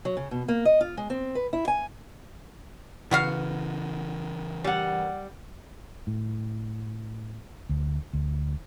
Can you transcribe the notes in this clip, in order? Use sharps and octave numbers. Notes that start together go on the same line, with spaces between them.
F#3
C#3
B2
A#3
D#5
F4
G#3
C4
B4
E4
G#5
C#3 E3 B3 F#4 F5
G3 F#5
A2
D2
D2